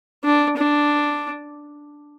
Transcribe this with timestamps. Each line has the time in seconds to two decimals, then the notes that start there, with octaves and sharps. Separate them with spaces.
0.24 D4
0.58 D4